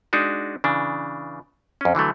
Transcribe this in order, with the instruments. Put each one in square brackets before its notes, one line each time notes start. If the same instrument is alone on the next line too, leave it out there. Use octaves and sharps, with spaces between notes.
[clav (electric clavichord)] G#3 D4 D#4 F#4
C#3 E3 D4
F2 C#4
D3 E3 F#3 A3